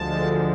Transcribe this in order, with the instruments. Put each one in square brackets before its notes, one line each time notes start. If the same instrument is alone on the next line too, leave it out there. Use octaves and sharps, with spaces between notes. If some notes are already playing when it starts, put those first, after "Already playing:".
Already playing: [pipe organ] D2 D3 F3 G#3 A5